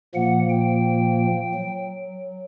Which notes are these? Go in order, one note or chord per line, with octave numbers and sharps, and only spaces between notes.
A#2 F3 A#3 F#5
G5
F#3